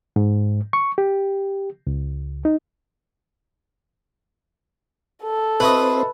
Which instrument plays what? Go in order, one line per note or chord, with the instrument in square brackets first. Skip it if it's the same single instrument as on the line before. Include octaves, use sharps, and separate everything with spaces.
[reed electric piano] G#2
C#6
G4
C#2
D#4
[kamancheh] A4
[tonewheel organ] C4 C5 [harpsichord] E4 F#4 D#5 [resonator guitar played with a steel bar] B4